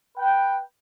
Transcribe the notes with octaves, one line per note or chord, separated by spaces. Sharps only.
B4 G5